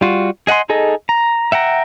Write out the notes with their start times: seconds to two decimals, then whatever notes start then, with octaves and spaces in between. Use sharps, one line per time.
0.01 G3 F4 F#4
0.47 G#4 D#5 F#5 G#5 C6
0.69 D#4 G#4 A4 D#5
1.09 A#5
1.52 E5 F#5 G5 A#5